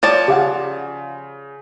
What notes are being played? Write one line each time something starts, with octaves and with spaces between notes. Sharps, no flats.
F3 C#5 D5 A5
C#3 G4 F5 F#5